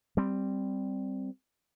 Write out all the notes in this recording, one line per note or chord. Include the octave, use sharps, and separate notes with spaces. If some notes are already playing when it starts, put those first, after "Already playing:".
G3 C4